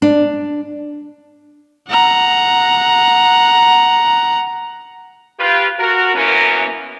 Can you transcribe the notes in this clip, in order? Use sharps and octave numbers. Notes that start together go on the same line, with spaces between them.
D4
F#5 A#5
F4 G4 B4
F#4 A#4
F#2 E3 A#3 B3 C#4 A#4